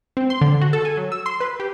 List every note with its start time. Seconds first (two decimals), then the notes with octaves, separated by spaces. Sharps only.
0.17 C4
0.30 C6
0.41 D3
0.61 F#4
0.73 A4
0.85 G#5
0.97 F#3
1.12 E6
1.26 C6
1.40 B4
1.60 G4